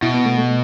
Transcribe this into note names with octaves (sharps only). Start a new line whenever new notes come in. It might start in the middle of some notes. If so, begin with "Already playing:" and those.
B2 E4
B3
A3
A3